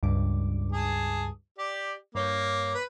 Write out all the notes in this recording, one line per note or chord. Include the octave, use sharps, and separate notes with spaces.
C#2 G2 D6
G#4 A5
G4 D5
G2 A#3 C#5 G6
B4